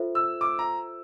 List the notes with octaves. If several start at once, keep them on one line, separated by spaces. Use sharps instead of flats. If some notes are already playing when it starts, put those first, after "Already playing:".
Already playing: F4 A4 C5 E5
E6
D6
A#5